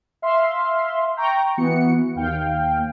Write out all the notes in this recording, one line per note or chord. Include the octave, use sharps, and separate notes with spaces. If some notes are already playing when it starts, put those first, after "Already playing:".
E5 F5 C6
G5 A#5 C#6
E3 B3 F#4 C#7
D#2 F5 G5